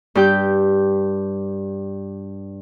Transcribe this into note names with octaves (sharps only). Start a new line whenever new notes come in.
G2 G4 G6